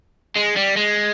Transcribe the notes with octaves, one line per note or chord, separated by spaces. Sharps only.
G#3
G3
G#3